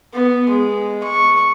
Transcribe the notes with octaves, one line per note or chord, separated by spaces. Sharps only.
B3
G#3
C#6